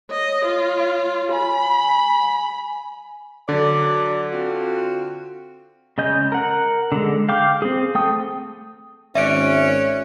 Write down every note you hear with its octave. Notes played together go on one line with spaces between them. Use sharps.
C#5 D#5
F4
G#5 B5
D3 F#3 D5
C4 F4 F#4
C#3 G#3 D#5 G6
A#4 F#5
D3 G#3
F5 G5 D6
C4 G#4
A3 G5 D#6
G#1 C#4 D5 E5 F#6 D7